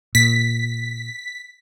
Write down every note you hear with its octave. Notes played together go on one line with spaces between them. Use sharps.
A#2 B6